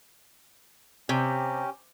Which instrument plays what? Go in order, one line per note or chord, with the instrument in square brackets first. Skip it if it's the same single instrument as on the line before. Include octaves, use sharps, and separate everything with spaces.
[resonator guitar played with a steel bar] C3 [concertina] C#4 G4